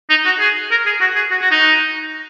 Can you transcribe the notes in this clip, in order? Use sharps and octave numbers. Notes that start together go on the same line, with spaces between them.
D#4
F#4
G#4
A#4
G#4
F#4
G#4
F#4
F#4
D#4